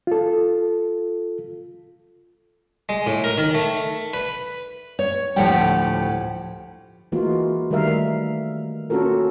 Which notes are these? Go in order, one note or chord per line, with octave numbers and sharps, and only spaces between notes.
F4 A4
G#3
A2
A#4
D#3
A3
B4
C#5
D2 A2 F3 G4 F#5 G5
E3 G#3 A#3 F4 F#4
D#3 G3 A3 A#4 E5 F5
A#3 C#4 F4 F#4 A4 A#4